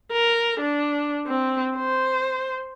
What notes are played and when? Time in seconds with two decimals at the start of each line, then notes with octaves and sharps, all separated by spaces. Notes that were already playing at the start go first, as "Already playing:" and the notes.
0.13 A#4
0.61 D4
1.27 C4
1.77 C5